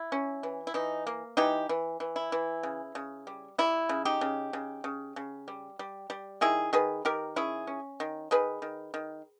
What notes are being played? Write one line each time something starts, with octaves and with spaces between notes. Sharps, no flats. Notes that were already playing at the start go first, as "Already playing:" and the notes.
Already playing: E4
C#4
E3
E4
E3 D#4
A#3
E3 D#4 G4
E3
E3
E4
E3
C#3
C#3
G3
G3 E4
C#3
D#4 G4
C#3
C#3
C#3
C#3
G3
G3
G3
D#3 E4 G#4
D#3 G#4 B4
D#3 G4 A#4
C#4 E4 G#4
C#4
D#3
D#3 G#4 B4
D#3
D#3